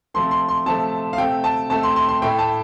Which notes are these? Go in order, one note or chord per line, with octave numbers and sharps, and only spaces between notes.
C3 F3 A3 C6
C6
C6
C3 F3 A3 A5
F5
C3 A3 G5
A5
C3 A3 A5
C6
C6
C6
A2 A3 G5
A5